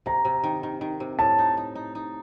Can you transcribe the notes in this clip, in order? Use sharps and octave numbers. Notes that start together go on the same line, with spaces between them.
C3 A#5
C3
D#3
D#3
D#3
C3
A2 A5
D#4
D#4
D#4
D#4